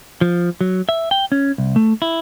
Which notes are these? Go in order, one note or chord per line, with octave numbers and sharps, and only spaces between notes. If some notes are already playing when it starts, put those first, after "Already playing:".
F3
F#3
E5
G5
C#4
C2
A3
E4